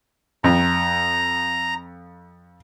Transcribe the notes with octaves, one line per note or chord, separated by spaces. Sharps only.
F2 A#5